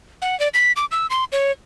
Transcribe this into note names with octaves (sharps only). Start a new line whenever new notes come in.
F#5
D5
B6
D6
E6
C6
C#5